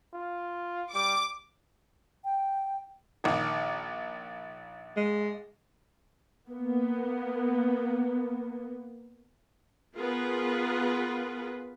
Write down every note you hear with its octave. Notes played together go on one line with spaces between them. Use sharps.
F4
G3 D6
G5
A#1 D#3
G#3
A#3 B3
B3 F4 G#4 A#4 B4